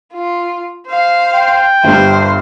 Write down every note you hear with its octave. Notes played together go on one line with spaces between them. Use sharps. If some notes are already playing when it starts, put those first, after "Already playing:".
F4
C5 F5
G5
G1 G2 C5